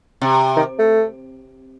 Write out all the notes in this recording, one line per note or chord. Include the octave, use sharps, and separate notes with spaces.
C3
D#3
A3